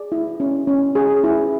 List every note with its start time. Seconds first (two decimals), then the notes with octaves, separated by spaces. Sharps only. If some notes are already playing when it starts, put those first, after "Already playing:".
Already playing: G#4 D5
0.12 E4
0.40 C#4
0.67 C#4
0.95 G#4
1.24 E4